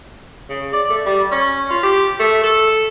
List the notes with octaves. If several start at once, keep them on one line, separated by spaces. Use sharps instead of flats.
C#3
D5
A3
G3
C#4
F4
G4
A3
A4